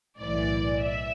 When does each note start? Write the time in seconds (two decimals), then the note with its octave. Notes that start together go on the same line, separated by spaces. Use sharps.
0.19 B1 A2 E3 D5
0.82 E5